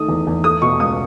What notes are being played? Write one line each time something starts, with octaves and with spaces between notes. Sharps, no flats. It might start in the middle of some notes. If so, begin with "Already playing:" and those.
Already playing: D#3 A3 D#6
E2
E2
A3 D#6
B2 C#6
C#2 D#6